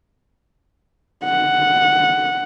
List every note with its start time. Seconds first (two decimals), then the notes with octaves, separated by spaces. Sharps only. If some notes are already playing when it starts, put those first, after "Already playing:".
1.25 F#5